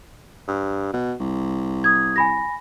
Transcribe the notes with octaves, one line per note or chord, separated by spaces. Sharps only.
G2
B2
C2
D#6 G#6
G#5 B5 A#6